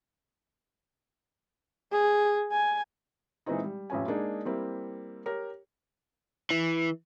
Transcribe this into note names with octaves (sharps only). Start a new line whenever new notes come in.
G#4
G#5
A#2 E3 G#3 C4 D#4
G3
A1 F2 C#4 G#5
G#3 A#3 D4 D#4 G#4
G3 A#3 C4 E4
G4 A#4 C#5
E3